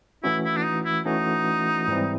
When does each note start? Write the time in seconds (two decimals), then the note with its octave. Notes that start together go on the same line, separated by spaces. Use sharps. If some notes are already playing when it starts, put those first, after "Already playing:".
0.23 E3 A3 C#4 E4 F#4
0.44 E4
0.57 D4
0.65 D#4
0.85 E4
1.05 E3 A3 C#4 D#4 F#4
1.88 G#2 E3 G3 C4 E4